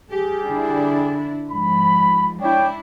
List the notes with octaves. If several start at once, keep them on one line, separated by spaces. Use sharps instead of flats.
G3 G4 G#4
D3 D4 E4
G#2 F3 B5
D4 E4 C#5 D5 G5